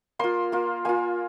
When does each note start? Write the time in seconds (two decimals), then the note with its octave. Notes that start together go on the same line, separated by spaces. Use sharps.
0.19 A#3 F4 C6
0.52 A#3 F4
0.85 A#3 F4 G#5